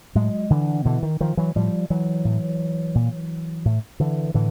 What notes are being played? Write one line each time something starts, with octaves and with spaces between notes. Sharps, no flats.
A2 F#3 G#3
D3 E3
B2 D3 E3
D#3
D#3 F3
E3 F#3
A2 F3 G3
E3 F#3
A2
A#2
A2
D3 E3
A2 D3 E3